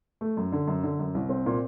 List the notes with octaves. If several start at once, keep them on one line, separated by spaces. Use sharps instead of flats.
A3
F#2
D3
F#2
D3
F#2
C2
C4
A#2